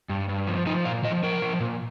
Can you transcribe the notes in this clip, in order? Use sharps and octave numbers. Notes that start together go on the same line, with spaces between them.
G2
G2
F3
F3 D#4
A#2 F5
F3 D#5
F3 A#4
F3
A#2